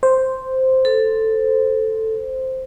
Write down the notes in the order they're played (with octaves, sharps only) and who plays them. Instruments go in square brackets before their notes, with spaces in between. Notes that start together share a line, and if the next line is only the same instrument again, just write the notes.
[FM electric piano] C5
[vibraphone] A4